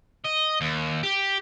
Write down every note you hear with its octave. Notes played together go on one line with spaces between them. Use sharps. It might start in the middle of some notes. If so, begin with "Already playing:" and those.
D#5
D#2
G4